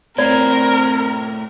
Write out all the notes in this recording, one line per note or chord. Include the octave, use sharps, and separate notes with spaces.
A2 C4 F4 A#4 D5